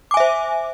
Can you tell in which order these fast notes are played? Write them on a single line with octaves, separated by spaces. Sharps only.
D6 G#5 E5 C5